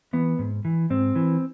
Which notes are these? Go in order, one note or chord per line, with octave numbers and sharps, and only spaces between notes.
E3 B3
G#2
E3
G#2 C4
E3